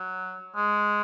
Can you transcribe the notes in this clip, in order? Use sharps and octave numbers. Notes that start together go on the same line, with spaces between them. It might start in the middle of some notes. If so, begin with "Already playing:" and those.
Already playing: F#3
G#3